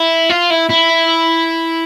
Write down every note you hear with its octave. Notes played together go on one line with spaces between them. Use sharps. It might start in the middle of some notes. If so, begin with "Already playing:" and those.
Already playing: E4
F4
E4
E4